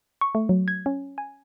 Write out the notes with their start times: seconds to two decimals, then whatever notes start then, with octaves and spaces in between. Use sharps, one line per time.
0.21 C#6
0.35 A3
0.49 F#3
0.68 G#6
0.86 C#4
1.18 G#5